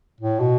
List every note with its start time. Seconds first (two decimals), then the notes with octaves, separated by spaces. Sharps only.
0.20 A2
0.40 B2